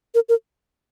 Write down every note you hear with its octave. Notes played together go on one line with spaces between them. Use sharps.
A#4
A#4